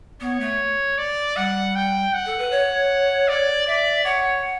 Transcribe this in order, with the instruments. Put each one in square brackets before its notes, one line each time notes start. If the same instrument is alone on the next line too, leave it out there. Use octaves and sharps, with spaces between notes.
[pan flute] B3 [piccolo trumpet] C#5
[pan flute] A3
[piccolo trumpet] D5
[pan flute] G3 [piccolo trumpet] F#5
[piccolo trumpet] G5
F#5
[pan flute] A4
B4
C#5
[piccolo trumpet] D5
[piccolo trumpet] D5 [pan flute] E5
[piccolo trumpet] C#5 [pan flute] F#5